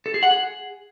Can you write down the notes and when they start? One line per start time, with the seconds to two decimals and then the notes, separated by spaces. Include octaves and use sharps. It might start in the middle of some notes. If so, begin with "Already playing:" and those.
0.06 A4
0.14 G#4
0.23 F#5
0.31 G#4